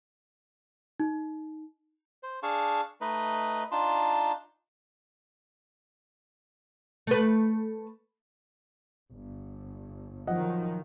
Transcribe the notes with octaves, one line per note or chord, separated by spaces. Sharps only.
D#4
C5
D4 G#4 F5 A5 C#6
A3 D#4 B4 D#5
D4 D#4 F4 A5 C6
A3 B4
G1
D#3 F3 F#3 D#5 F#5